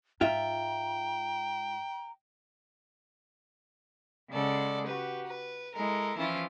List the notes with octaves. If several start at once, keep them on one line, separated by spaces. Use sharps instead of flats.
G#2 F4 E5 G5 A#5
C#3 G#3 A4 D5 F#5
F#4 G4 B4
B4
G#3 E4 A4 A#4
E3 F3 C#4 E4 F4